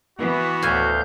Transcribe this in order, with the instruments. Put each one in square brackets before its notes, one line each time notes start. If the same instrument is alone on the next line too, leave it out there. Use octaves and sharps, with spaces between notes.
[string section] E3 B3 [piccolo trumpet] F#4
[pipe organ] D2 F5 G6 [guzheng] A2 G#5